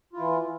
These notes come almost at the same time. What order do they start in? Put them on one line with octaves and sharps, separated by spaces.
F4 E4 E3